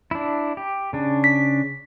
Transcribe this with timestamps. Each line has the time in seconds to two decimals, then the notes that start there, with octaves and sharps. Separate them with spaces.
0.11 D4 E4
0.57 G4
0.93 C#3 D4
1.24 B6